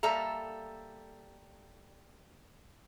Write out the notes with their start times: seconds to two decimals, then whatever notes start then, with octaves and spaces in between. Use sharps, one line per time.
0.03 G3 A#3 A4 E5 A#5